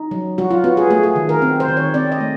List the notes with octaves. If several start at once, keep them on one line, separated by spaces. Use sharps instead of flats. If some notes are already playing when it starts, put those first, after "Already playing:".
Already playing: D#4
F#3
F#3 F#4
F4
B3 F#4
G#4
A3 G#4
G#4
D#3
A#4
C4
C5
D#3
C#5
C4 D5
D#5
A3